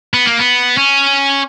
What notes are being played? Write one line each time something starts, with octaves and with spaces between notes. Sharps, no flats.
B3
A#3
B3
C#4